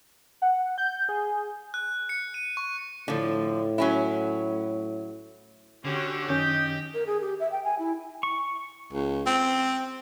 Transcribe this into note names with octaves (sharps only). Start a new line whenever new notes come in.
F#5
G6
G#4
F#6
C#7
D#7
C#6
A2 D3 F3
F#3 C#4 E4
D3 C#4 F#4 G4
F#2 D#3 C#4 G4 D#5 G6
A#4
G#4
G4
E5
G5
G#5
E4
C#6
C#2
C4